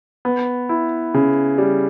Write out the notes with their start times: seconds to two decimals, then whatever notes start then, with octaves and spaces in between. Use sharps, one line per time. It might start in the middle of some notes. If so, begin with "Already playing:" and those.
0.25 B3
0.69 E4
1.14 C#3
1.58 G3